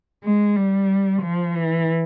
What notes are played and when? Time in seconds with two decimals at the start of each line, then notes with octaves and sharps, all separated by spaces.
0.24 G#3
0.56 G3
1.22 F3
1.55 E3